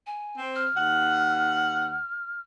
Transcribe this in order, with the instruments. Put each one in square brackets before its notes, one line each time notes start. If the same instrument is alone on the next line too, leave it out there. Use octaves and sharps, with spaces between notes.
[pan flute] G#5
[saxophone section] C4
[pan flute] F6
[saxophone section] D#2 F#5